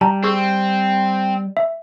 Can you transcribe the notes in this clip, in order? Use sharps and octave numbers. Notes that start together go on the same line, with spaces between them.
G3 A5 A#5
C4 G#4 C#6 E6
E5